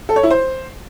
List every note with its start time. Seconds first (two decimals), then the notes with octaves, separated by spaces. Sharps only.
0.09 A4
0.16 C#5
0.23 E4
0.30 C5